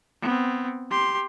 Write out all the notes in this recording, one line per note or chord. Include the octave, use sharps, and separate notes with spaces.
B3 C4
G4 C6